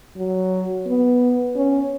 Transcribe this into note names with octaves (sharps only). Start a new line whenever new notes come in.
F#3
B3
C#4